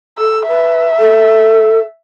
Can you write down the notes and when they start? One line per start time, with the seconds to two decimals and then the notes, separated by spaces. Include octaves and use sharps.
0.18 A4 E6
0.47 B4 E5
0.99 A4